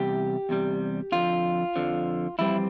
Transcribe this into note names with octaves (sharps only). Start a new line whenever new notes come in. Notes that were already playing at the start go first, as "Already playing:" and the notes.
Already playing: E2 C3 G3 G4
E2 C3 G3
F2 D3 F3 F4
F2 D3 F3
F2 E3 G3 C4 E4